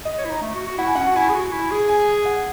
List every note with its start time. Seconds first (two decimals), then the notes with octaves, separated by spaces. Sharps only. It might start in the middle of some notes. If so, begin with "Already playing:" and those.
0.05 D#5
0.18 C#5
0.25 E4
0.30 D#4
0.41 A3
0.55 F#4
0.67 F#4
0.78 E4 F#5
0.87 G#5
0.95 C#4 F#5
1.07 F#4
1.16 E4 G#5
1.29 G#4
1.34 F#4
1.52 E4
1.71 G#4
1.89 G#5
2.25 F#5